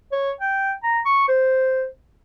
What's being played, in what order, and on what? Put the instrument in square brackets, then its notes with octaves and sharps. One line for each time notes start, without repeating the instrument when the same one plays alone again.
[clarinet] C#5
G5
A#5
C#6
C5